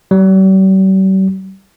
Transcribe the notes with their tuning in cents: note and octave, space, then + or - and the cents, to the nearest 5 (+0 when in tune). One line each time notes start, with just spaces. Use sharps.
G3 -45